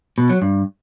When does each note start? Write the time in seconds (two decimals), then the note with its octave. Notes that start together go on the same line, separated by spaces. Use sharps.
0.18 B2
0.30 F#3
0.42 G2